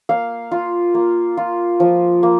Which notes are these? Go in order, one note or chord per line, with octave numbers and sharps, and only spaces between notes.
A#3 F5
F4
A#3
F4
F3
A#3